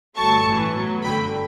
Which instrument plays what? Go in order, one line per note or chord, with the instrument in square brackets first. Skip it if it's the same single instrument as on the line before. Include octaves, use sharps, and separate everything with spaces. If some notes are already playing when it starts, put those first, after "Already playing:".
[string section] G1 G2 F#3 A3 A5 C#6
A1 A2 E3
A2 F#3 B3
G1 F#2 D3 F#3 G5 B5